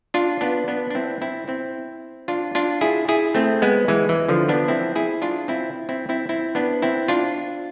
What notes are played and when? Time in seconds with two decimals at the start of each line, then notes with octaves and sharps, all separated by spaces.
0.14 D4 F4
0.41 B3 D4
0.68 B3 D4
0.90 D4
0.95 C4 E4
1.22 C4 E4
1.48 C4 E4
2.28 D4 F4
2.55 D4 F4
2.81 E4 G#4
3.09 E4 G#4
3.35 A3 C4
3.62 G#3 B3
3.88 E3 G#3
4.09 E3
4.29 D3 F3
4.48 B3 D4
4.68 C4 E4
4.95 E4 G#4
5.22 D4 F4
5.48 C4 E4
5.89 C4 E4
6.09 C4 E4
6.29 C4 E4
6.55 B3 D4
6.82 C4 E4
7.08 D4 F4